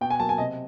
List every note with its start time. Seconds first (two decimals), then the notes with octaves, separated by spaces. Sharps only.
0.01 B2 G5
0.10 G#5
0.20 F#3 A#3 A5
0.29 G#5
0.38 C3 D#5